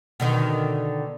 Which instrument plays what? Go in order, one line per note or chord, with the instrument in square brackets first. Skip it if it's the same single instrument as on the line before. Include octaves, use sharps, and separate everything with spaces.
[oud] B2 D3 D#3